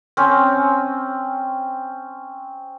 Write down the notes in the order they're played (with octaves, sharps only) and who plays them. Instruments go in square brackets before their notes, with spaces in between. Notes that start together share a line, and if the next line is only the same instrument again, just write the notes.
[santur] C4 C#4